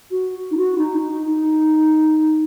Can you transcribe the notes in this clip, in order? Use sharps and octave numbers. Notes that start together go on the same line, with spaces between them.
F#4
D#4
F#4
D#4
D#4